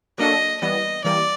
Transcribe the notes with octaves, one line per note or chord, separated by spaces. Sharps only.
F#3 A#3 D4 F#4 A4 D#5
E3 G3 B3 D#5
E3 G3 A#3 D5